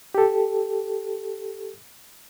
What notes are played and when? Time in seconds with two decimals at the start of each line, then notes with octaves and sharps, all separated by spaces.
0.15 G4 A4